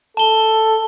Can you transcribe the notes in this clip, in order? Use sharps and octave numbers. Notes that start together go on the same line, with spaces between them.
A4 A5 G7